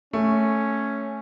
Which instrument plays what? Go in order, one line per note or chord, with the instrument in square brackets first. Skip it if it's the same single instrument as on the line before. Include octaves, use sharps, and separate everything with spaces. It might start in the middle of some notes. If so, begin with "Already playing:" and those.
[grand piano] A3 [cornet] C#4